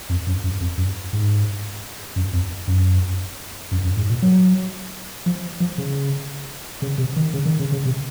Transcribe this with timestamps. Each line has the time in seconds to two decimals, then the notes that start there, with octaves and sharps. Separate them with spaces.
0.09 F2
0.27 F#2
0.44 F#2
0.61 F2
0.77 F#2
1.13 G#2
2.16 F#2
2.33 F2
2.67 F#2
3.71 F#2
3.83 F#2
3.97 G#2
4.09 A#2
4.22 F#3
5.26 F3
5.60 F3
5.78 C#3
6.82 C#3
6.98 C3
7.16 D#3
7.34 C#3
7.45 D#3
7.59 C#3
7.72 C#3
7.85 C3